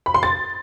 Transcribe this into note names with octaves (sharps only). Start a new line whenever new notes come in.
B5
C6
A6